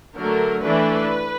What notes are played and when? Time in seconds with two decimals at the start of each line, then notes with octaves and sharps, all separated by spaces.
0.16 D3 F#3 A3 A#4
0.64 E3 A3 D4 B4